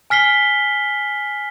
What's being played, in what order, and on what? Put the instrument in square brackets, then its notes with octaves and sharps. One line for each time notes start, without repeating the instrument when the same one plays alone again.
[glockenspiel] G#5 F6 B6 C7 G7